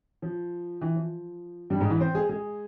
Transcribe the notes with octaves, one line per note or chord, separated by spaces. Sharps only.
F3
E3
F3
G2 G3
G#2 G#3
E3 E4
C4 C5
G#3 G#4
G#3 G#4